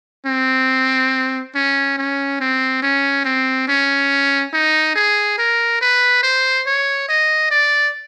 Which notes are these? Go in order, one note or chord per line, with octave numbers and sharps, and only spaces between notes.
C4
C#4
C#4
C4
C#4
C4
C#4
D#4
G#4
A#4
B4
C5
C#5
D#5
D5